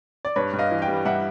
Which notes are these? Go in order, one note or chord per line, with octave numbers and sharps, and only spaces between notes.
D5
G2 B4 C#5
G2
D#5 F5
E3
F5 G5
G3
G2 E5 F#5